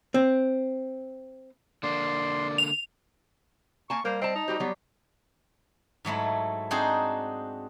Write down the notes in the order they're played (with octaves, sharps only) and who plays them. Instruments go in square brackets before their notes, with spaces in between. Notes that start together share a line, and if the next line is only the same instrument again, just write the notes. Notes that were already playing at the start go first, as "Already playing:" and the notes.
[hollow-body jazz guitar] C4
[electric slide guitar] D3 A#3 D4 [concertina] D5 [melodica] C6
[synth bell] F7
[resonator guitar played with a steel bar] A#3 G#5 A5 [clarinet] C#6
[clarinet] G3 [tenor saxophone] A#3 [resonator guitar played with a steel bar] C5
[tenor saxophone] C4 [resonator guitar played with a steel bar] D#5 A5
[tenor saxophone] D#4
[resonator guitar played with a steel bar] G3 G4 C5 [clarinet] F#4
[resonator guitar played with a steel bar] F#3 G3 [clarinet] B3
[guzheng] G#2 F#3 A3 E4
C4 D4 D#4 F#4 G#4 C5